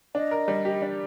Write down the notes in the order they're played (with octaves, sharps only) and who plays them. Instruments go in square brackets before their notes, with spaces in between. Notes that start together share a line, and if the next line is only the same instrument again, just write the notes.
[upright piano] D4 [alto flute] D#5
[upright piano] A#4
G3
G4
D4